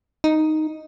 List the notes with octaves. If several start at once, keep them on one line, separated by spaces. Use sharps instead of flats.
D#4